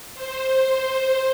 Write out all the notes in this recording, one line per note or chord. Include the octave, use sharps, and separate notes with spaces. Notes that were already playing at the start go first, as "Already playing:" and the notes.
C5